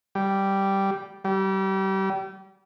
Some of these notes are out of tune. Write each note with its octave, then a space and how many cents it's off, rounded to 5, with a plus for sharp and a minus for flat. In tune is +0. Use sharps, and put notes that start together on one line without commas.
G3 -5
G3 -30